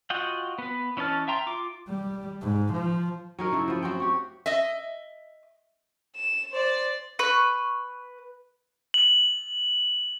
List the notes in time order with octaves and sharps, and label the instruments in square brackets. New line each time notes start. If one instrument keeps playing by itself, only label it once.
[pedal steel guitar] F4 F#4 D#5 F#5 G5
B3 B4
E3 C#4 D#5 A5 F6
E5 G5 A#5 C6
F4 D6
[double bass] G3
G#2
F3
[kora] F#3 D#4 A#4
C#3 A3 E4
F3 B3
F#3 C4 G5
F#4 G4
[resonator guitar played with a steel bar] D#5 E5
[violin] E7
C5 D5
[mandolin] B4 C#6
[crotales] F#7